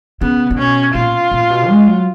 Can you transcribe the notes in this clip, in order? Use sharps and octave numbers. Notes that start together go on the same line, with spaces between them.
C#3 B3
C#3
B2 C#4
A#2 F4
A#2
B2
G#3
F#3